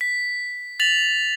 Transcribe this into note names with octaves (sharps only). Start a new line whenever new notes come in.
B6
A6 B6 F7 F#7